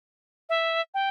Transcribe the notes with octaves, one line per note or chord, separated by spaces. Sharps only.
E5
G5